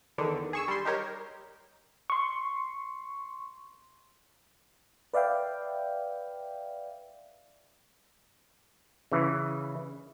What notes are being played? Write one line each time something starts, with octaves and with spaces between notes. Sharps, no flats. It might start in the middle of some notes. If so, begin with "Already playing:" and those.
E2 D3 D#3
G#4 C#6 E6
G3 C6
D#4 G4 A#4 C#5
C6 C#6
B4 D5 E5 F5 G5
C#3 E3